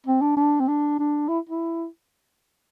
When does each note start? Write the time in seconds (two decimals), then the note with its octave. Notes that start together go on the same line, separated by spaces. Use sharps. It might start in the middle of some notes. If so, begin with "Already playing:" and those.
0.07 C4
0.21 D4
0.37 D4
0.60 C4
0.68 D4
0.99 D4
1.28 E4
1.49 E4